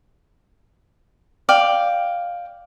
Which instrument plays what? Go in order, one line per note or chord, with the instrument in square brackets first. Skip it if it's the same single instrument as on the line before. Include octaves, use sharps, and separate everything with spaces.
[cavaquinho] D5 F5 G5